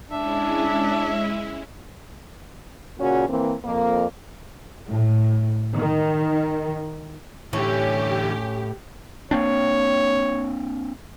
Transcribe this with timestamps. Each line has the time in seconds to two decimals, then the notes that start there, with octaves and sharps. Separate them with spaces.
0.11 G#3 C#4 D4 E4 E5
2.99 A#2 C#3 C#4 F#4
3.29 E3 A#3 C4
3.65 F2 A#3
4.90 A2
5.77 D#3
7.53 A2 D3 E3 C#4 G4
9.31 A#3 C4 D4 C#5